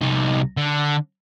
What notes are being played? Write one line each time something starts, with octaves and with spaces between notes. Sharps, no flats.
C2 D#4
D3